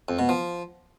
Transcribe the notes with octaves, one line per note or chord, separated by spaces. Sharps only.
F2
B2
F3